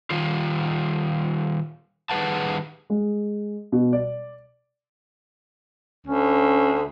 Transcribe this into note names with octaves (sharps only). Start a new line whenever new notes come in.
D#3 G3 F4
D#3 G3 G#4 B4 F#5 A5
G#3
B2
D5
D2 C#4